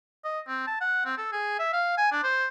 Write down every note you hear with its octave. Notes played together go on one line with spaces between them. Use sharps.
D#5
C4
A5
F#5
C4
A4
G#4
E5
F5
G#5
D4
C5